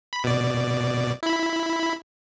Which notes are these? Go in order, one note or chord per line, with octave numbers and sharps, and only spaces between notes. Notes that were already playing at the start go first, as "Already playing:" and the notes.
B5
B2 D5
E4 B5